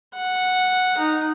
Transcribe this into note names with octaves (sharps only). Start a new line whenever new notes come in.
F#5
D#4